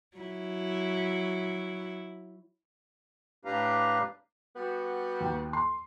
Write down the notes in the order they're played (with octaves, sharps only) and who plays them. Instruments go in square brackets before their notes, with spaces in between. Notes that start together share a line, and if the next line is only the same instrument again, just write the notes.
[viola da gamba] F#3 E4
[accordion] A2 D4 G4 B4 F5 A#5
[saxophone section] G3 B3 F#4
[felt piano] D#2
C6